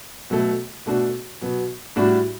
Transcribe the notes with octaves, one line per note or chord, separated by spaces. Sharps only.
B2 F#3 A3
B2 A3 D4 F#4
B2 F#3 B3
A2 G3 D4 F#4